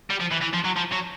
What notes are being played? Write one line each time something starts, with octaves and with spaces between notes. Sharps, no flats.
G3
F3
E3
E3
F3
F#3
F3
F#3